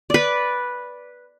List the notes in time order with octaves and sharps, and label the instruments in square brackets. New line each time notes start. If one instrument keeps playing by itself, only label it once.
[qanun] B4 D5